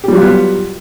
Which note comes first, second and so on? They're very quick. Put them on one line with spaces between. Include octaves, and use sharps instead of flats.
G4 G3 F#3 F4 B3